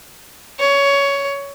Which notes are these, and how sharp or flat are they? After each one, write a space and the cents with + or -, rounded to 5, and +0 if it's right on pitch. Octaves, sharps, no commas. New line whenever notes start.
C#5 +15